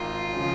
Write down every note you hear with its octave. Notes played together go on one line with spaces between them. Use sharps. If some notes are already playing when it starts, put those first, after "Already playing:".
Already playing: G#1 D#4 F4
C#3 F3